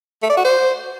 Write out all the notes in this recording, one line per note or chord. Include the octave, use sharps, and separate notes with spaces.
A3
D5
F#4
C5